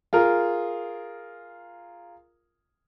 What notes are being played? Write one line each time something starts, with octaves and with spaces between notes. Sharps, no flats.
F4 G#4 A#4